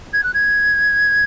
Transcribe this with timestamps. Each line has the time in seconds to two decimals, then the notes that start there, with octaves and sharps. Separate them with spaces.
0.13 G#6
0.24 F#6
0.34 G#6